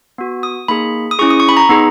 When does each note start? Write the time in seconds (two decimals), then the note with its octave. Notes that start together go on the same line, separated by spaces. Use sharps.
0.18 B3 F#4
0.43 D#6
0.68 A#3 D#4 G#4 B5
1.11 D#6
1.19 C#4 E4 G#4 C#6
1.30 D#6
1.40 C#6
1.49 B5
1.57 A#5
1.69 B3 D#4 G#4